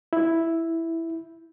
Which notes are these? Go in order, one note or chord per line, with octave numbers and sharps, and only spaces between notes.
E4